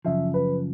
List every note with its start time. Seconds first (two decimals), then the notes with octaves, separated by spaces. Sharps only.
0.05 F#2 C#3 F3 E5
0.34 B4